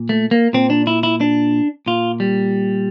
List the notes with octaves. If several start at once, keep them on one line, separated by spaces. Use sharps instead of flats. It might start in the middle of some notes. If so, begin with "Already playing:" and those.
Already playing: A#2
A3
A#3
A#2 C4
D4
E4
E4
D4
A#2 F4
G3